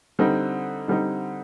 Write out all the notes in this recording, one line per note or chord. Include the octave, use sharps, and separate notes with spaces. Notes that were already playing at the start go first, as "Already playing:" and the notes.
D3 G3 C4 D#4
D3 G3 C4 D#4